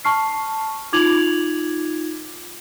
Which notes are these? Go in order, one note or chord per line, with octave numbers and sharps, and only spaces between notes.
A5 C#6 F6 C7
D#4 F4 D6 G#6 F7 F#7